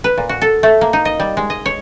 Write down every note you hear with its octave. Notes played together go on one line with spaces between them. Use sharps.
B4
A#2
F#4
A4
A3
A#3
D#4
D#5
G3
G#3
D#5
C#5